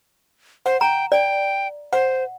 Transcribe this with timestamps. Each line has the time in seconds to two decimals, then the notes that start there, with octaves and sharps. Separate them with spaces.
0.66 C5 F#5
0.81 G5 A#5
1.12 D5 G5
1.93 C5 F#5